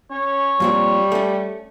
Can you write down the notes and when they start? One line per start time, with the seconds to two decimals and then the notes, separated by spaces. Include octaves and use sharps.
0.11 C#4 C#5
0.60 F2 A#2 G3 C4
1.12 A3 C#4